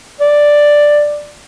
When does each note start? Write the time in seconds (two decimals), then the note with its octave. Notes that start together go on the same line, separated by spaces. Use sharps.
0.21 D5